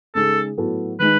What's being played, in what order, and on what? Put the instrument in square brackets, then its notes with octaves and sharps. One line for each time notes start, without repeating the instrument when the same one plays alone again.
[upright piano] C#3 G#3 D#4 G#4 [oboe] A4
[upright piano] A2 F#3 B3 F#4 A4
[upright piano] D#3 G#3 D#4 [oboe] B4